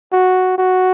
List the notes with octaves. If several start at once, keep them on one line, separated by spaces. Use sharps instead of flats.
F#4
F#4